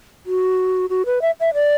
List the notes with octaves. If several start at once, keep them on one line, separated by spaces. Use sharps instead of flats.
F#4
F#4
B4
E5
E5
D5